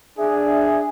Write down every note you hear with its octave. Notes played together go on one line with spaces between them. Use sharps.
D4 G#4 E5